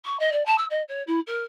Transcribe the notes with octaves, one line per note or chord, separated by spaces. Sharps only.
C#6
D#5
D5
A5
E6
D#5
C#5
E4
A#4